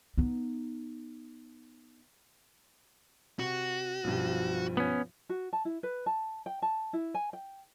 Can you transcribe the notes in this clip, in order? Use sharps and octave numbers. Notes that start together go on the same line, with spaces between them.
B3 D#4
C3 F#4
B1 G2 F3
B3 C#4
F#4
A5
E4
B4
A5
G5
A5
E4
G#5
G5